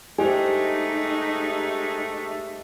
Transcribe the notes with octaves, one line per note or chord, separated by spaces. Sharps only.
G2 G#3 A3 D#4 G4 C5 G#5